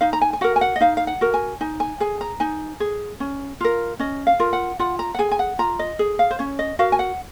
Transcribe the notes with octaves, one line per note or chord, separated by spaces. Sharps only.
D#4 F5
A#5
G#5
G#5
F#4 A#4 F#5
G#5
F#5
D#5
D#4 F5
F5
F#5
F#4 A#4
G#5
D#4 G#5
G#5
G#4 G#5
A#5
D#4 G#5
G#4
C#4
F4 A#4
C#4 D#5
F5
F4 A#4
F#5
F4 F#5
A#5
F#5
G#4 G#5
G#5
F#5
F4 A#5
D#5
G#4
F5
C5
C#4 C#5
D#5
F#4 A#4 F5
G#5
F#5